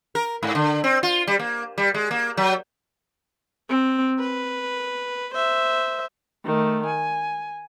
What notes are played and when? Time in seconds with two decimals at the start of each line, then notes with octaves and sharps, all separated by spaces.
0.15 A#4
0.43 G#2
0.55 D3
0.84 C4
1.03 F4
1.27 G3
1.39 A#3
1.78 G3
1.94 G#3
2.11 A#3
2.37 F#3
3.70 C4
4.20 B4
5.35 C5 E5
6.45 D#3 A3
6.86 G#5